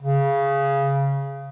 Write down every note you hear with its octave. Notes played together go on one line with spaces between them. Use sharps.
C#3